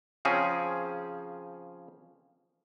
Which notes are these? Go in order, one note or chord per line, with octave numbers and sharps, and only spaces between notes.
C#3 F3 C4 C#4 G#4